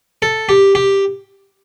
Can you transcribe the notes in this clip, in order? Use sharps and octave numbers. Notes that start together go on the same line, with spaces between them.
A4
G4
G4